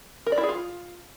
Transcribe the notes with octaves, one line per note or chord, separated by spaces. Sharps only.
A#4
D5
E4
G#4
F4